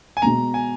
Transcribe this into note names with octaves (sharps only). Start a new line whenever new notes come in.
G#5
B2 G#3 B3 A#5
G#5